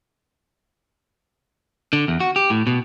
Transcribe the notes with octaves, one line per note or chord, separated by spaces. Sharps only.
D3
E2
F#4
G4
A2
B2